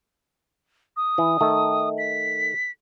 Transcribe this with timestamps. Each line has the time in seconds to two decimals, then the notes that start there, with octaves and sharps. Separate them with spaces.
0.97 D#6
1.18 E3
1.41 D#3 A3
1.98 B6